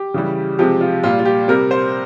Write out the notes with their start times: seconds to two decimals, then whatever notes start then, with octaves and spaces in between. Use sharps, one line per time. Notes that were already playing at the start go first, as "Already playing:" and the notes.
Already playing: G4
0.14 C#3 E3 G3
0.59 C3 F3 G#3 G4
0.81 F4
1.03 A#2 G3 F4
1.19 F4
1.25 G4
1.48 C3 G3 A#4
1.71 C5